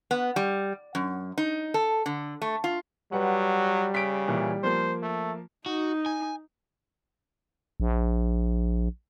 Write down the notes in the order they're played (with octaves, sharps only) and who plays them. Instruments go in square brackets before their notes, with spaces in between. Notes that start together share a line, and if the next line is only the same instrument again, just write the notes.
[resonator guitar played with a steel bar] B3
G3
F#2
D#4
A4
D3
A3
F4
[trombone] F#3 [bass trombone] G3 [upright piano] B4 F#5
[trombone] C#3 [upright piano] B6 D7
[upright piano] A#2 E3 E4
[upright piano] F3 A#3 [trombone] C5
[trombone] A3
[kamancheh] D#4 [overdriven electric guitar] F#4
[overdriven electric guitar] G#5
[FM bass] A#1